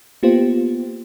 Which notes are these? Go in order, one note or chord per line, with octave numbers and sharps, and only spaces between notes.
A#3 B3 F4 G4 C5